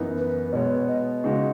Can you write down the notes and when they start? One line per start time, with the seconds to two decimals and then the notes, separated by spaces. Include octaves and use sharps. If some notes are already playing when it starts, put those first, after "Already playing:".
Already playing: F#2 E3 B3 D#4 A#4
0.18 B4
0.53 B2 G#3 B3 C#5 D#5
0.88 D#5
1.24 C#3 G#3 D#4 F#4